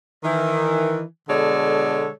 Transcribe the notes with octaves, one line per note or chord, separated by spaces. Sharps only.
D#3 E3
B2 D3 G#3 A4 C#5 D5